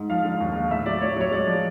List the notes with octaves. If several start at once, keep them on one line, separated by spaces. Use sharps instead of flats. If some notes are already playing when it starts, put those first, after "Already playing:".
Already playing: G#2
F3 F5
D3
D#2
G#3
A2 E5
F#3 D5
A2 C#5
F#3 C#5
G#3 D5
F3